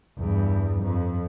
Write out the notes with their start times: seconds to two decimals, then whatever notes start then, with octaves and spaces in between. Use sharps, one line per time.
0.19 E2 G2
0.82 F2